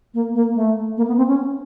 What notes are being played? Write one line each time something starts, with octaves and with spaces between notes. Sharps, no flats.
A#3
A#3
A3
A#3
B3
C4
C#4